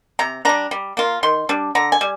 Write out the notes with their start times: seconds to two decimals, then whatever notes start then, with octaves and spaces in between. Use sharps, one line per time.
0.19 C3 A#5
0.45 G3 D4 A#5
0.71 G3
0.97 A#3 F4
1.23 D#3 C6
1.49 G3 D4
1.75 D3 A#5
1.92 G#5
2.01 G3